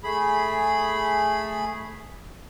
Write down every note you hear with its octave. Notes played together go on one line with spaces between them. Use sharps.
A3 G#4 B5